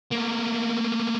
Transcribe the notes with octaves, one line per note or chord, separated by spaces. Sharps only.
A3 A#3